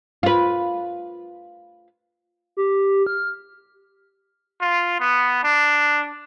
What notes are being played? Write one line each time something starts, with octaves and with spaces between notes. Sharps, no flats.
F4 B4
G4
F6
F4
B3
D4